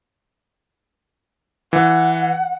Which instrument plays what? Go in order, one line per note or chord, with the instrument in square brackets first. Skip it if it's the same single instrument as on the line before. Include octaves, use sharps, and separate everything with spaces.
[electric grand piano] E3 [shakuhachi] F#5